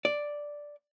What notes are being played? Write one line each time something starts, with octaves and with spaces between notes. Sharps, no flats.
D5